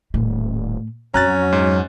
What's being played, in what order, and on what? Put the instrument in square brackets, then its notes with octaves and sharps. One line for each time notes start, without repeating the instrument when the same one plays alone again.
[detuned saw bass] D#1 [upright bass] A2 A3
[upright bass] F2 [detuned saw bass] F#3 [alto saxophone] C#4 [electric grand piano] A#5 F#6 A6
[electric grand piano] G#2